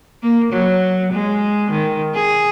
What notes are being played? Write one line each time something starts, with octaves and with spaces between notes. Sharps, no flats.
A#3
F#3
G#3
D#3
G#4